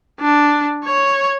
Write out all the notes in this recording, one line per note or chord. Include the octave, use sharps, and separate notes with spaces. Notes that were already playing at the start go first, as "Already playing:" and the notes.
D4
C#5